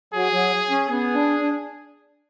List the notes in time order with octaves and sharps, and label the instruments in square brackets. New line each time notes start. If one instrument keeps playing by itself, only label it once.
[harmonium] F#3 [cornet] G#4
[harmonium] F#3
C#4
[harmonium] B3 [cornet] G#4
[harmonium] D4
D4